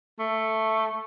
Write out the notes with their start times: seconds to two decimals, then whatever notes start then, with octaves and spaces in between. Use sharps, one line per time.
0.19 A3